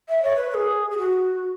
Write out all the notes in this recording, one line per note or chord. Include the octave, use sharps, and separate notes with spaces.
E5
C#5
B4
B4
G#4
G#4
F#4